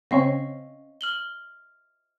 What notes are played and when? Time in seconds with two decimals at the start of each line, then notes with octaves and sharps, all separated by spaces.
0.11 C#3 C4 C#4 D#5 F5 C#6
1.01 F6 F#7 G7